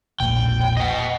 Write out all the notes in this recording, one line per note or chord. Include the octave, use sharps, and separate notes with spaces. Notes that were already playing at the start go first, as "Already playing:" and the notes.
E1 A#1 A#2 G5
D#5 F#5